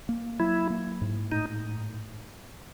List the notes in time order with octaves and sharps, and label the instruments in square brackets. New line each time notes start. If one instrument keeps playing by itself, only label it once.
[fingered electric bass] A#3
[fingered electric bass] F#3 [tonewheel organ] E4
[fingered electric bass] A#3
G#2
[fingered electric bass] A2 [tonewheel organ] D#4